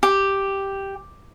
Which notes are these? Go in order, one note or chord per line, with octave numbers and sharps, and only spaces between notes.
G4